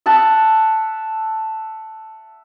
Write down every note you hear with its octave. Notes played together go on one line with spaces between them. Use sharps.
E5 F#5 A5